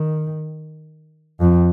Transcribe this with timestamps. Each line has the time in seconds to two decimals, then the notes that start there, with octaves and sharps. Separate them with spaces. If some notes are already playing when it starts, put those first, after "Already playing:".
Already playing: D#3
1.40 F2